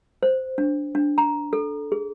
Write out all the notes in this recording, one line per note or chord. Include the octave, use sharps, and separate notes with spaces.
C5
D4
D4
A#5
A4
G#4